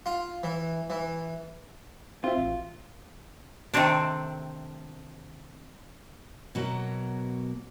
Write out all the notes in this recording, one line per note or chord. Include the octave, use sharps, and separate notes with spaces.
F4
E3
E3
C4 F4 F#4 E5
A1
C3 D#3 A3 C4 D4
B2 F#3 A#3